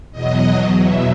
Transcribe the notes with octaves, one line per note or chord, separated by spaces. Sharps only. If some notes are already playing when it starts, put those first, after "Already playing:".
E2 B2 F#3 D#5
E5